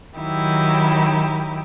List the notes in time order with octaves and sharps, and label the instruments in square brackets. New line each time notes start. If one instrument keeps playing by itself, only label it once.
[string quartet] D#3 F#3 D#4 E4 G4